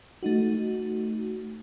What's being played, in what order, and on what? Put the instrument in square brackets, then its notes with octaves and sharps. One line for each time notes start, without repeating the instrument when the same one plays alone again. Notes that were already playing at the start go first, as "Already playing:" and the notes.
[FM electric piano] A3 D#4 F#4